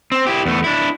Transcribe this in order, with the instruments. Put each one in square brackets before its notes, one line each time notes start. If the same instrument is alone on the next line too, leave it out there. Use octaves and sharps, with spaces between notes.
[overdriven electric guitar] C4
E4 G4
E2 A3
D4 E4